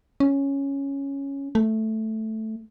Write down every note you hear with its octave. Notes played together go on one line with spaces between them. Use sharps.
C#4
A3